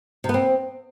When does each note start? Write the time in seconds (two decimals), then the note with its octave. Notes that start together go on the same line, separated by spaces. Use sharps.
0.24 C3
0.29 B3
0.34 C4